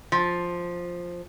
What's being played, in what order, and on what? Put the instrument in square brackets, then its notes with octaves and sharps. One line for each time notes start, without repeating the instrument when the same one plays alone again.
[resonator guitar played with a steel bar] F3